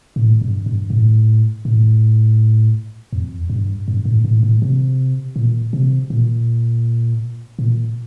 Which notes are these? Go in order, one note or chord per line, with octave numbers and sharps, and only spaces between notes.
A2
G2
G2
A2
A2
F2
G2
G2
A2
A2
A2
C3
A#2
C3
A#2
A#2